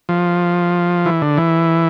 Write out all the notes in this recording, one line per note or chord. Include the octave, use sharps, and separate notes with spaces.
F3
E3
D3
E3